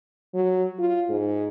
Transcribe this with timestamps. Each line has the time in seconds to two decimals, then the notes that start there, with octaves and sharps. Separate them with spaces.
0.34 F#3
0.79 F4
1.09 G#2